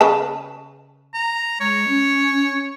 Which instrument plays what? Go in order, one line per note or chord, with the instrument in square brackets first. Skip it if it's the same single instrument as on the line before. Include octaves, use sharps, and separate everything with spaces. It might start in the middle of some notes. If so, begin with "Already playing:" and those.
[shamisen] C#3 B4 A5
[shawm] A#5
[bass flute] G#3 [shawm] C#5
[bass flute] C#4